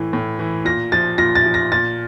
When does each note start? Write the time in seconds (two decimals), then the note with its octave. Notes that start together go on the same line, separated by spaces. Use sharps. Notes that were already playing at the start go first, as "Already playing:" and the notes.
Already playing: A2 E3
0.13 A2
0.39 E3
0.65 A#2 A#6
0.92 F3 A6
1.18 A#2 A#6
1.35 A6
1.45 F3
1.54 A#6
1.72 A#2 A6